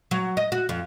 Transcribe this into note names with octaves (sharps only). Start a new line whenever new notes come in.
F#3
D#5
F#4
F2